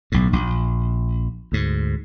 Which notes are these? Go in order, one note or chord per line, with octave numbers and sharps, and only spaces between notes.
B1 A2
A#1
D2 G#2